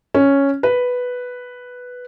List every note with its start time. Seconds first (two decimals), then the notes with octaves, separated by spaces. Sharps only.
0.14 C#4
0.63 B4